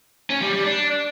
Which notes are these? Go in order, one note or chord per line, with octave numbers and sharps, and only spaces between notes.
C#4
G3
G3
D4